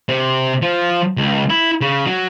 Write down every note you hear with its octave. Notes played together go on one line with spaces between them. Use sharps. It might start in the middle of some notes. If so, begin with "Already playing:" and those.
C3
F3
C#2
E4
C#3
F#3